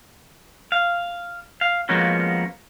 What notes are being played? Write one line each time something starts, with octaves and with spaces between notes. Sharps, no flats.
F5
F5
F3 G#3 A#3 B3 C#4 F#4